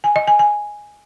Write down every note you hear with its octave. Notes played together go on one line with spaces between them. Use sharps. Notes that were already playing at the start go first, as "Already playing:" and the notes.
G#5
D#5
G#5
G#5